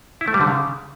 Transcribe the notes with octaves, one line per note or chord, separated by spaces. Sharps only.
E4
A3
G3
D3
C#3